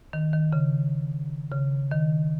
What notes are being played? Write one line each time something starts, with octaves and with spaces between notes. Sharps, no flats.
D#3
D#3
C#3
C#3
D#3